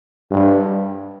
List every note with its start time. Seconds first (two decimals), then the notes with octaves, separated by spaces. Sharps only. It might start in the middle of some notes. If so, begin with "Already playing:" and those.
0.31 G2